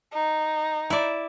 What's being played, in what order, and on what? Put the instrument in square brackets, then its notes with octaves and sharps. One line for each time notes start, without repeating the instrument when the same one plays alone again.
[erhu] D#4
[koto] E4 D5